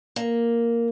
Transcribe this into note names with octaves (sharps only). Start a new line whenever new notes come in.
A#3